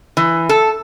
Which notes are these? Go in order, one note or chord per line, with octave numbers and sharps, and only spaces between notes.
E3
A4